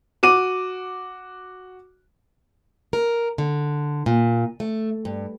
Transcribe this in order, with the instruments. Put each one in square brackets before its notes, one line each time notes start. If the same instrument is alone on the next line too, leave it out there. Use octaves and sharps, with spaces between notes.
[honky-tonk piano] F#4 D6 D#7
[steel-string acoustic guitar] A#4
D3
A#2
A3
G2